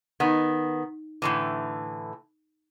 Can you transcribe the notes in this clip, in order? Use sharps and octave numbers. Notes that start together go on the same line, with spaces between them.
D#3 B3 D#4 F#5
A2 D3 E3